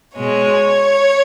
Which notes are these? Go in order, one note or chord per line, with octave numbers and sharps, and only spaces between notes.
B2 G#3 C#5